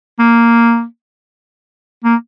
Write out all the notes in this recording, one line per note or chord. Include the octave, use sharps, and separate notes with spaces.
A#3
A#3